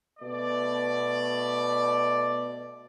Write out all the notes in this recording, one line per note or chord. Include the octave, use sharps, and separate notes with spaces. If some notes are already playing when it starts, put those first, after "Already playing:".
B2 A3 D5